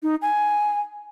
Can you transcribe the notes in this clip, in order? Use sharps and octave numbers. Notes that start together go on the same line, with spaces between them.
D#4
G#5